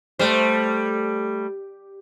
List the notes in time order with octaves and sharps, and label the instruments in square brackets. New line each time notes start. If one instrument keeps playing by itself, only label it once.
[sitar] G3 [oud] A3 C5